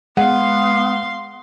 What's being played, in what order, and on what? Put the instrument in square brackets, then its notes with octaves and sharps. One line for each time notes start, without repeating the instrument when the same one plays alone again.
[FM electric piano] G#3 [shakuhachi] B3 [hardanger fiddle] F5 C6 [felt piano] F#5